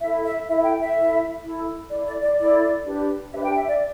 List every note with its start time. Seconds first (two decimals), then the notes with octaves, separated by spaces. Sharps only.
0.01 E4 E5
0.04 A4
0.24 E5
0.48 E4 A4 E5
0.64 G5
0.80 E5
0.95 E4 A4
1.43 E4 A4
1.90 E4 A4 D5
2.06 D5
2.22 D5
2.38 E4 A4 D5
2.84 D4 G4 B4
3.31 D4 G4 B4 E5
3.44 G5
3.56 E5
3.67 D5